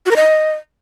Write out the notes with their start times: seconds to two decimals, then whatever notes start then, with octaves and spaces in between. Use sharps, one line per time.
0.06 F#4
0.11 A#4
0.16 D#5